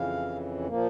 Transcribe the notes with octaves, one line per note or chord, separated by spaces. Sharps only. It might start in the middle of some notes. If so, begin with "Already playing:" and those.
Already playing: F2 C#3 E3 F5
A#2 F3 A#3